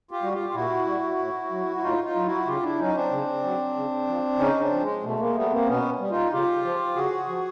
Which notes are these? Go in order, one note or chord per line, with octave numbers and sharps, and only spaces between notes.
F4 G4
G3 F#4
F4 G4
F4
A#2 E4 F#4
G3
A2
F#3
E4
A2 D#4 F4
D#4 F4
F#3
E4 F#4
C#3 F4 G4
D4 E4
F#3 C#4 D#4
C4 D4
C#3
F#3
C#3
F3
C#3 C#4 D#4
C4 D4
F3
G#3
B2 A3
G#3 A#3
G3 A3 B3
A#3 C4
B2 B3 C#4
G3
D#4 F4
C#3 F4 G4
F3
C#3 F#4 G#4
F3